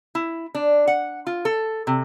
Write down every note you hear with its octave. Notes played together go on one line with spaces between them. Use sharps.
E4
D4
F#5
F4
A4
C3